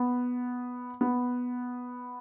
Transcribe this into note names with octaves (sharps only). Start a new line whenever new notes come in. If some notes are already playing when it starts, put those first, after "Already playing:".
Already playing: B3
B3